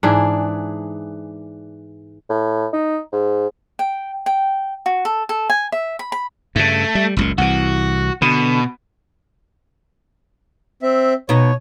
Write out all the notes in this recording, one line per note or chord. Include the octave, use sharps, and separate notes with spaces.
G#2 E3 D4 G#4
A2
D#4
G#2
G5
G5
F#4
A4
A4
G#5
E5
B5
B5
G2 C#3 A3
G3
F#1 C#2 A#2
C2 E3 F#4
B2 D3
C4 E5
B2 D#4 C#5